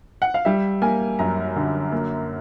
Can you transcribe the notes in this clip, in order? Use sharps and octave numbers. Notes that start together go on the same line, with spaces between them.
F#5
F5
G3 E5
A#3 G#5
F#2 A#5
D3
A#3